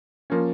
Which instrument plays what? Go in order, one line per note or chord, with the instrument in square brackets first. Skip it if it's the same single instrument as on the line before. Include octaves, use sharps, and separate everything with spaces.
[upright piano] F3 A#3 C#4